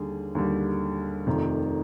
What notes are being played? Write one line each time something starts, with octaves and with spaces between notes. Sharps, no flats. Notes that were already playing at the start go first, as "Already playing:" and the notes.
Already playing: D#2 D3 G3 G#4
D#2 D3 G3
F1 F2 C3 D#3